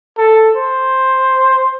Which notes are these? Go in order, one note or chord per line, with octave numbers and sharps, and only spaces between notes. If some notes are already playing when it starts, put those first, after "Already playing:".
A4
C5